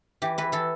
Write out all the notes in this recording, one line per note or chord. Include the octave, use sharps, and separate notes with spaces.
E3 G4
E3 B4
E3 A4